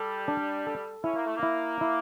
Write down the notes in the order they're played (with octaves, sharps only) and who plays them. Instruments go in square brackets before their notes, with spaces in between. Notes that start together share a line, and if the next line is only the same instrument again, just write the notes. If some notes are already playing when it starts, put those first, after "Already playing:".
Already playing: [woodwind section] G3 [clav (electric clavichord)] A4
[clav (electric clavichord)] D4
A4
[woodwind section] C#4 [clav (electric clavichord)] E4
[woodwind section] A#3
A3
A#3
[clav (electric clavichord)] E4
E4